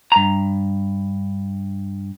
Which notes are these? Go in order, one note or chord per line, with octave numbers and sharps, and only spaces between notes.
G2 A#5